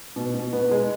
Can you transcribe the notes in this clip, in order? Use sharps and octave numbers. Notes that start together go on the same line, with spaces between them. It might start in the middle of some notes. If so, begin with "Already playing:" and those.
B2
B2
B3
G#3